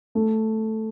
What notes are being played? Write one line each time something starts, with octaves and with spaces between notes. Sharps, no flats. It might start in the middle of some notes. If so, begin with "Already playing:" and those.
A3